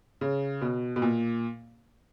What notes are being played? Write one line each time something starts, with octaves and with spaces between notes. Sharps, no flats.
C#3
B2
B2
A#2